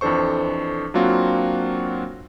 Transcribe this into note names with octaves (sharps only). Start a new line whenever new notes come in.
F2 E3 D4 A4 C5 C#6
F#3 A#3 C4 D4 F4 F#4